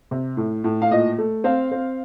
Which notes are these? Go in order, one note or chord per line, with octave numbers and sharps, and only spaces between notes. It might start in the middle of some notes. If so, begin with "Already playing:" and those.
C3
A2
A2
F5
A#2 D#5
A3
C4 F5
C4